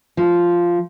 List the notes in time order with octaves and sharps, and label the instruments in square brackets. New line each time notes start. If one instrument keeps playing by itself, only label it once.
[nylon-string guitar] F3